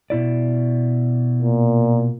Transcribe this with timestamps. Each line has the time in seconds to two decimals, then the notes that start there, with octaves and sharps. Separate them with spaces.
0.10 B2 E4 D5
1.42 A#2